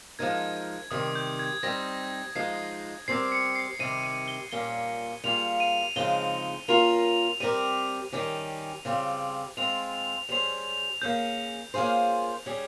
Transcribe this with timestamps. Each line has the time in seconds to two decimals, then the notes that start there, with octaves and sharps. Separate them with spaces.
0.19 F3 G#3 D#4 A#4 G#6
0.91 C3 D#3 G3 D#6
1.15 G6
1.39 G#6
1.63 G3 C4 D#4 A#6
2.35 F3 G#3 D#4 C7
3.08 G3 C4 G4 A#4 C7
3.32 C#7
3.55 C7
3.79 C3 D#3 G3 D#7
4.04 D#7
4.28 G7
4.52 A#2 G3 A#3 C#4 G7
5.24 G3 A#3 F4 G#4 F7
5.60 D#7
5.96 C#3 F3 G#3 C4 D#4 G7
6.68 A#3 C#4 F4 A#4 F7
7.40 G3 C4 G4 A#4 D#7
8.13 D#3 G3 C#4 G4
8.85 C#3 G3 C4 F4
9.57 G#3 C4 F4 F7
10.29 G3 C#4 G#4 C5 F7
11.02 A#3 C#4 G#4 G6
11.74 A#3 C#4 F4 G#4 C5
12.46 G3 C#4 G#4